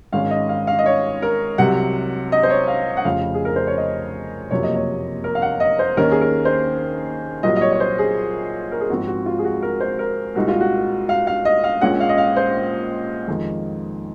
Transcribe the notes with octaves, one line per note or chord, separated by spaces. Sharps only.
G#1 G#2 D#3 G#3 C#4 F5
D#5
F5
F5
D#5
C#5
A#4
C2 C3 F#3 F#5
D#5
C5
C#5
F5
F#5
F1 F2 C#3 F5
G#4
A#4
C5
C#5
D#5
F#1 F2 C3 F#3 A#3 C#5
D#5
C#5
A#4
F5
F#5
D#5
C5
D#2 D#3 A#3 C#4 A#4
G#4
A#4
C5
C2 A#2 F#3 D#5
D#5
C#5
C#5
C5
G#4
A#4
G#4
G#1 G#2 F3 C4 F#4
F#4
F4
G#4
F#4
A#4
C5
A#4
C2 A#2 G#3 D#4 F#4
F4
F#4
F5
F5
D#5
F5
A#1 A#2 G#3 C#4 F#5
F5
D#5
F5
C5
F2 D#3 G#3